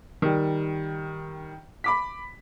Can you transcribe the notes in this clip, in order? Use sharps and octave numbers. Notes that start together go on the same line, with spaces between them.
D#3 G3
B5 D6 B6